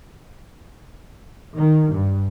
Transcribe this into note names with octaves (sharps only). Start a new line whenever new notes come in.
D#3
G2